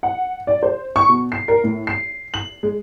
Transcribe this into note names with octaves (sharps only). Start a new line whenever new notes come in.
F#5
D5
C5
C#6
B2
C7
A#4
A2
C7
F#7
G#3